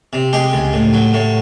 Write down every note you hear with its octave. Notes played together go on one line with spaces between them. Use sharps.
C3
G#3 G4
C#2
A2
F#3
A2